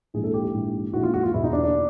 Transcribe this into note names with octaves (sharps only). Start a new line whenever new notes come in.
A#1 G#2 E3 G#4
A4
G4
G4
A#1 G#2 E3
A#1 G#2 E3 F#4
F4
F#4
F4
E2 B2 E4
D#4
D4
D4